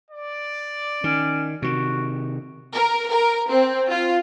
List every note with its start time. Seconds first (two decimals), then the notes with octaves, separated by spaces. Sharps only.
0.10 D5
1.04 D#3 C#4
1.62 C3 D#3 F#4
2.74 A#4
3.11 A#4
3.48 C4
3.90 F4